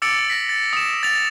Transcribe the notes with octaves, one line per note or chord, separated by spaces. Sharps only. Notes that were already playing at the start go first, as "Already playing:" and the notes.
D6 E6 A6 C#7 D7 F#7
A#6 B6 F#7
A6
D#6 E7
A6 F7